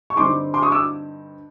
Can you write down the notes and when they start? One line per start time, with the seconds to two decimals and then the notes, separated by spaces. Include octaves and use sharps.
0.10 C#6
0.17 G2 D3 G3 C4 D#4 C6 D6
0.54 C6 D6
0.63 C#6 D#6
0.72 D6 E6